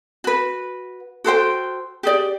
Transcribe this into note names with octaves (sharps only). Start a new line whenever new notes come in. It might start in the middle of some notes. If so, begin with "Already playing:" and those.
F#4 B4
F#4 A4 C5 G5
G4 G#4 D5